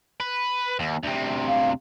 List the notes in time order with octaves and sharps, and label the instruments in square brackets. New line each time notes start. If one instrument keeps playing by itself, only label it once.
[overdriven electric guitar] B4
D#2
D2 C3
[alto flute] F5